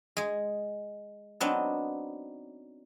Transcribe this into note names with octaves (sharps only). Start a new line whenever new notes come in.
G#3 G#4
F#3 B3 C4 D4 D#4